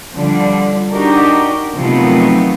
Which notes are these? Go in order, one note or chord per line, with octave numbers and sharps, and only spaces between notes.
D3 F3 G3 D4
D4 D#4 F#4 G4 A#4
C3 D#3 F3 F#3 A3 B3